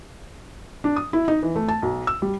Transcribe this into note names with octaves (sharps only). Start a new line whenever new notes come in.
D4
D#6
E4
D#4
E3
A3
A5
B1
E6
G3